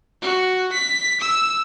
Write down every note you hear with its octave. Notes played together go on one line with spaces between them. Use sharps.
F#4
B6
E6